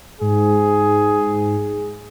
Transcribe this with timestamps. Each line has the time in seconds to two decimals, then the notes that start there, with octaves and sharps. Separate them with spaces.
0.21 G#2 G#4